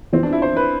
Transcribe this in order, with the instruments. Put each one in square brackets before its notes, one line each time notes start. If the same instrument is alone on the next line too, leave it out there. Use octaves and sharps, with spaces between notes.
[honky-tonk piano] F2 E3 B3 [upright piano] C4
[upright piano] D4
E4
C5
B4